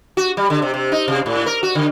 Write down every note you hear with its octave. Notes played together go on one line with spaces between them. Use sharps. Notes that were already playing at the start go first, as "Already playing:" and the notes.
F#4
G3
D3
C3
C3
D#4
C3
A2
A#4
F#4
D3